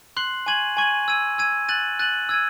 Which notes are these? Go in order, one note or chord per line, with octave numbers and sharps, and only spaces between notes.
C6 F#6 C7 F#7
G#5 C#6 G#6 D#7 F#7
G#5 C#6 G#6 D#7 F#7
E6 G#6 D#7
E6 G#6 D#7
F#6 A6 D#7 F#7
F#6 A6 D#7 F#7
E6 G#6 D#7